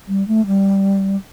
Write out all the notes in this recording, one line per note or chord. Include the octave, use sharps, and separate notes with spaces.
G3
A3
G3